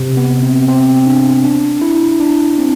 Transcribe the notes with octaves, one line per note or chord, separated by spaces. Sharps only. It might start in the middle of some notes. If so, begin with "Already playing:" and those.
Already playing: C3
B3
C4
C4
D4
D4
E4
D4
C4